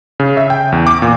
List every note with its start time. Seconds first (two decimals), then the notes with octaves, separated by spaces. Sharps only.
0.20 C#3
0.37 E5
0.50 G5
0.72 E2
0.87 D6
1.02 A#2